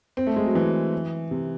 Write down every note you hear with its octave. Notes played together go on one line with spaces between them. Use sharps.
C4
A3
G#3
F#3
E3
C3